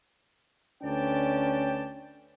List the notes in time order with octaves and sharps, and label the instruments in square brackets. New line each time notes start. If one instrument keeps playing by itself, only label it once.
[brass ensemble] D2 C#4 B4 D5 G5 A5